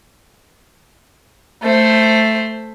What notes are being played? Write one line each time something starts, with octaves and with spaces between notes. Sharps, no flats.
A3 C5